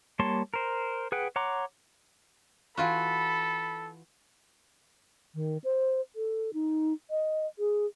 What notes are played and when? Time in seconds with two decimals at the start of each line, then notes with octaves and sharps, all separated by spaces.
0.19 G3 A#3 C#5 A5 C6
0.54 A#4 C5
1.12 G#4 B4 F#5 G5
1.36 C#5 F#5 A#5 C6 D6
2.77 E3 F4 F#4 A4 B5
5.35 D#3
5.64 C5
6.16 A4
6.54 D#4
7.11 D#5
7.59 G#4